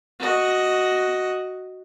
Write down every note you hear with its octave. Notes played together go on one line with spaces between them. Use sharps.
F#4 D#5